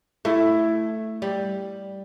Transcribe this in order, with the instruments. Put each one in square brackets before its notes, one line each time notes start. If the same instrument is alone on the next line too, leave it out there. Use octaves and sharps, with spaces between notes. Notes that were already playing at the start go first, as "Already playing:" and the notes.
[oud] A3 [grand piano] E4
[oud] G3